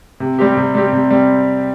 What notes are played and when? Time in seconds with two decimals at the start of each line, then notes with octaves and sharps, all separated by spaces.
0.20 C3
0.39 G3 C4 G4
0.57 C3
0.75 G3 C4 G4
0.93 C3
1.11 G3 C4